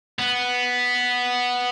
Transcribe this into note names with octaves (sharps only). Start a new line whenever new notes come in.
B3